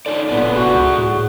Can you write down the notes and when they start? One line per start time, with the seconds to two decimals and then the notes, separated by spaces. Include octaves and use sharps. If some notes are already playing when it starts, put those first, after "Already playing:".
0.06 D3 D#4 C#5 D5
0.30 D1 A#2 B3 E4 D5
0.55 F1 F#4 G#4 F#5
0.73 C#2
0.98 A2